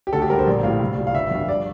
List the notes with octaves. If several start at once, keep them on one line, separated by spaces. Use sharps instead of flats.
G4
D2 A4
G4
D3 G3 A#4
C5
A#1
A2 G3 F5
C2
A#2 G3
F5
G1 E5
F2 D3 G3 F5
D5